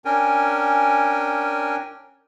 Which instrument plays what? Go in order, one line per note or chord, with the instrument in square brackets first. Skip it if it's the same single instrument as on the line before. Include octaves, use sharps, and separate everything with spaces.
[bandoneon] C#4 D4 A#4 G5 G#5